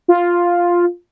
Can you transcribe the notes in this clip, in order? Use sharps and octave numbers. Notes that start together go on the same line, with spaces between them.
F4